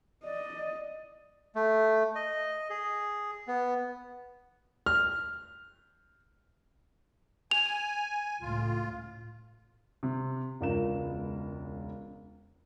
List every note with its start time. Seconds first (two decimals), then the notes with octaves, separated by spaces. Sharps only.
0.24 D5 D#5
1.55 A3
2.15 D#5
2.70 G#4
3.47 B3
4.86 F6
7.51 G#5 F7
8.42 C#2 A2 F4
10.03 C3
10.61 E1 C#2 F4 A#4 E7